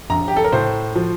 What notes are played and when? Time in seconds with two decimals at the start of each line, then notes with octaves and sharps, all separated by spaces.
0.10 A#1 A#5
0.28 G4
0.36 A4
0.44 A#4
0.53 A2 C5
0.95 F3